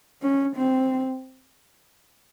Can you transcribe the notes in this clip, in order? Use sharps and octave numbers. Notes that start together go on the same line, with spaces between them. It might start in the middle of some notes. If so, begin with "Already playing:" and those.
C#4
C4